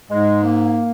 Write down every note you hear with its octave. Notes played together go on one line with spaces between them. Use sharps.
G#2 G#3
A#3